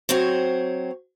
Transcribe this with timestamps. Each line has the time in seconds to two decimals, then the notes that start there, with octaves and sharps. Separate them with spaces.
0.09 F#3 C4 C5 C#5